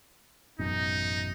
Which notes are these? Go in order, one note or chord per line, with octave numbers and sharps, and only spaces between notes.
A1 F#2 B2 D#4